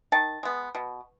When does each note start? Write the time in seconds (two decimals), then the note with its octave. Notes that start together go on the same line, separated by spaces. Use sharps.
0.12 D#3 A5
0.43 G#3 B3
0.75 B2